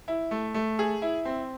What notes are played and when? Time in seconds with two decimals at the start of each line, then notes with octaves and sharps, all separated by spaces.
0.08 E4
0.31 A3
0.54 A3
0.79 G#4
1.02 E4
1.25 C4